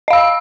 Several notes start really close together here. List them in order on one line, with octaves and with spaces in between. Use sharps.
D#5 F5 E6